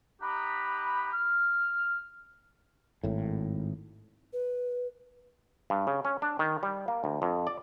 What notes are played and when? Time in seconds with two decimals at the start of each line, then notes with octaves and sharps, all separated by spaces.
0.21 D#4 G4 F#5 A#5 B5
1.12 F6
3.04 G#1 A2
4.33 B4
5.70 G2
5.87 C#3
6.05 C#4
6.22 D4
6.39 D#3
6.63 G3
6.88 A#3
7.04 D2
7.22 F2
7.47 D5